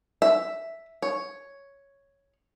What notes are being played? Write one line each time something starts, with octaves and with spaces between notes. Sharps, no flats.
E5
C#5